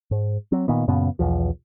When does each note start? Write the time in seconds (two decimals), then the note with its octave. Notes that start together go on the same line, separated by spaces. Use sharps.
0.11 G#2
0.52 F#3 C4
0.68 A#2 D#3 B3
0.88 F#2 A#2 C#3 B3
1.19 B1 E2 F3